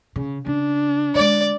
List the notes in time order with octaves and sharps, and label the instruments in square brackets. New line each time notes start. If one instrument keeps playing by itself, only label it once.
[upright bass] C#3
[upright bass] C#3 [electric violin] D4
[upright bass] D3 G#3 [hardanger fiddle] D5